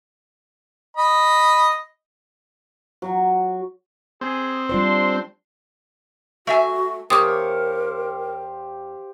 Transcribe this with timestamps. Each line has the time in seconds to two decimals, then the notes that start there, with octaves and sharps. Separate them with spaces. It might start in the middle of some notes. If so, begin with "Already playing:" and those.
0.97 D#5 B5
3.02 F#3
4.21 C4 G#4
4.69 G3 D4 F4 C5 C6
6.47 A3 F#4 E5 G#5
7.10 E2 G4 A#4 C5 C#5 F5 D6 D#6